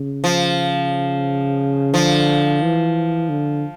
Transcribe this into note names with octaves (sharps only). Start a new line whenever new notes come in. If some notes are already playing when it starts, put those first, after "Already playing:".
Already playing: C#3
F3
D3 F3
E3
D3